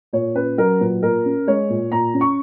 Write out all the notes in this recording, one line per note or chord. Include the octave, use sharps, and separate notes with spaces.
A#2 C#5
C#4 B4
F#3 A#4
A#2 B4
A#2 A#4
C#4
G#3 C#5
A#2
A#2 A#5
C#4
C#6